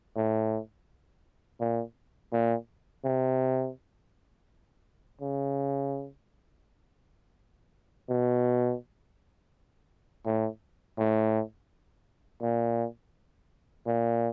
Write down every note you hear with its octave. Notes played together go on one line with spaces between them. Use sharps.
A2
A#2
A#2
C3
C#3
B2
A2
A2
A#2
A#2